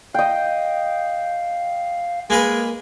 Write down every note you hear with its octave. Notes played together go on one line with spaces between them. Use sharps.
D#5 F5 G5
G#3 A#3 A#4 B4